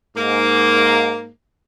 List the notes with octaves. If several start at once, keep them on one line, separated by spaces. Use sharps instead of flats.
G#2 A#3